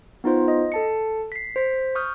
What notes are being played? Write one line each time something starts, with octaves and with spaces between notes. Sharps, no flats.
B3 D#4 F4 C5
D#5
A4 A5 C#7
B6 C7
C5 B6
C#6 D#6 F6 G6